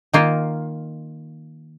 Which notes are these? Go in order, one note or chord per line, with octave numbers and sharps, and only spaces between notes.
D#3 A#3 F4